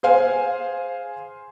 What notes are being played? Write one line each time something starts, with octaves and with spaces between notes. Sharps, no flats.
G#4 C5 F5 G#5